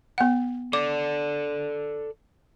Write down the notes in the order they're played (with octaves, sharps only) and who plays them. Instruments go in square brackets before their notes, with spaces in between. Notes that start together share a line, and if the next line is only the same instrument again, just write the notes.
[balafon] B3 F#5
[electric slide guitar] A4 D5 [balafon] D6